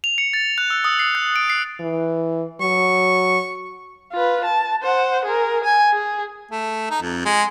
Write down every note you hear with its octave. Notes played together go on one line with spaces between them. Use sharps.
F7
C#7
A6
F#6
E6
D#6
C7
F#6
D7
C7
E3
F#3 C#6
F4 B4
A5
C5 F#5
G#4 A#4
G#5
G#4
A3
D#4
F2
G#3